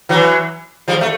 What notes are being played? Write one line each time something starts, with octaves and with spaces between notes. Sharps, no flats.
E3 F#3
F3 G3
A3